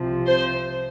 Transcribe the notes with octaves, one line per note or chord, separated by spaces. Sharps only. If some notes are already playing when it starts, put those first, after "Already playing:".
Already playing: C2 C3 F3
C5